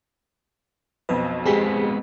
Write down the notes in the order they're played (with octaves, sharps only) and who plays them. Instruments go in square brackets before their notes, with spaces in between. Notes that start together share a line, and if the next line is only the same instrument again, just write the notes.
[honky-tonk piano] B1 F2 B2 [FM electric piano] B4
[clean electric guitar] G#3 B3 C4 [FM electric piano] G4 G#4 B6